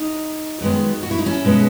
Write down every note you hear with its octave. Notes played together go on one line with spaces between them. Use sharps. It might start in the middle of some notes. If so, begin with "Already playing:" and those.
Already playing: D#4
F#2 D#3 G#3 B3
F#4
E4
D#4
C#4 E4
B2 G#3 B3